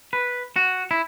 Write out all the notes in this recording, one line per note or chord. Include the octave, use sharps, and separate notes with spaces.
B4
F#4
E4